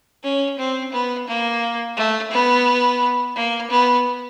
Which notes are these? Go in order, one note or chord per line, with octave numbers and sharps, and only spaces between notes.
C#4
C4
B3
A#3
A3
B3
A#3
B3